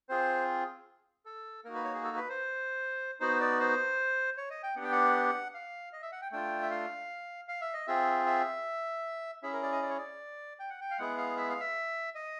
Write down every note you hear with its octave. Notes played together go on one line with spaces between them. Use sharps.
C4 F4 G#4 C5
A4
A#3 D#4 F#4 A#4
B4
C#5
G#4
A4
B4
C5
B3 D#4 F#4 C5
D5
C5
C#5
D#5
G5
B3 D4 G4 F#5
G5
F#5
F5
D#5
E5
F#5
G5
A3 D4 F4 G5
E5
F5
F5
E5
D#5
C4 F4 G#4 E5
E5
C#4 E4 G#4 E5
A#4
D5
D#5
D5
C#5
D5
G5
F#5
G5
F5
G#3 B3 E4 G#4 F#5
F5
E5
F5
E5
D#5